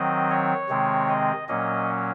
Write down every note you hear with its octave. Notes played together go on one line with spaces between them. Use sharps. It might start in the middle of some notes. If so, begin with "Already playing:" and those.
Already playing: D#3 F#3 C4 D#5
C#5
C3 D#3 G#3 C4
D#5
A#2 F#3 A#3 C#4 D#5